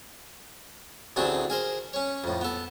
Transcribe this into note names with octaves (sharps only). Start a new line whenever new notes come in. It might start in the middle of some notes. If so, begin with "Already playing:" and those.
A1 D2 A3 C4 D4 G#4
G#4 A#4 C5
C#4 C#5
F2 A2
B3 A4